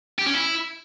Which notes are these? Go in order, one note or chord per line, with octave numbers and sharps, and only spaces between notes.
G4
C#4
E4